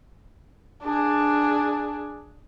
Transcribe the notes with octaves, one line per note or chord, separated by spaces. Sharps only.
D4 G#4